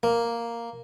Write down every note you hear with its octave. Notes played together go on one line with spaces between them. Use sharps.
A#3